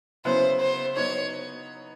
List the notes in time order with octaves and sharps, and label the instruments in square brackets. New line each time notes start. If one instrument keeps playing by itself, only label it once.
[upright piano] C#3 F#3 B3 E4 [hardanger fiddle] C5
[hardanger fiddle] C5
[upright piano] F#3 B3 D#4 [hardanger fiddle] C#5